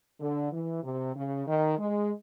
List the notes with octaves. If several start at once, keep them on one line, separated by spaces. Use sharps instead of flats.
D3
E3
C3
C#3
D#3
G#3